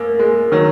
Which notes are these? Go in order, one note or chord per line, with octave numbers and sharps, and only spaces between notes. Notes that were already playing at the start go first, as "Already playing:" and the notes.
Already playing: F#2 A#3
G#3
D#3 F#3